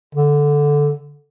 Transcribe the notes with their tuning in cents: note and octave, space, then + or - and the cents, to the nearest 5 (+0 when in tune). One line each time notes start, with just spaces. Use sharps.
D3 -5